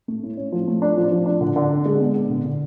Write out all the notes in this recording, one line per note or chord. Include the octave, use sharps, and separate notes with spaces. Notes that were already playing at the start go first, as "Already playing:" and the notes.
A3
A2
C#4
F3
A3
D4
F3
F3
D4
D3
D3
D4
G#3
B3
B3
D3
D3